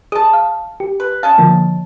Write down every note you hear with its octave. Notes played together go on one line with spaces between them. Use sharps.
G#4 D#5 A5 D#6
F5
G4
B4
C#4 D#5 F5 A5
D3 F3 A#3